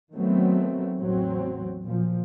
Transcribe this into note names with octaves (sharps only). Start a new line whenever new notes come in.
D#3 F#3 A3 B3 C4
A1 E2 F#3 C4
A#2 F3